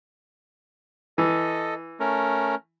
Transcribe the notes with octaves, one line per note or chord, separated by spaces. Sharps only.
E3 A4 D#5
A3 C#4 A#4